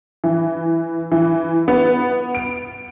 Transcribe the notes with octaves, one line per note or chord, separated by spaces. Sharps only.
E3
E3
B3
D7